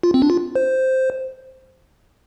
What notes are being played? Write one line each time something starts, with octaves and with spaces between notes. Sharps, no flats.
F4
C4
D4
F4
C5